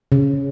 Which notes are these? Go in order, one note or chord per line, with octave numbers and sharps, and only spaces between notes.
C#3